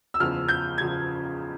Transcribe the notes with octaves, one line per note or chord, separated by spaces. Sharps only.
E6
F#1 E2 C#3 F3 F6
G6
C#3 F3 G#6